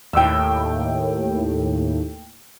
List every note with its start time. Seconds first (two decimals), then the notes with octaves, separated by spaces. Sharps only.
0.13 D#2 A2 G5 E6